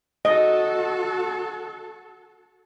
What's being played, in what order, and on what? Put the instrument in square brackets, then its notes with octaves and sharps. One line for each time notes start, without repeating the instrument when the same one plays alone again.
[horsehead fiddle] F#4 A4 [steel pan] D#5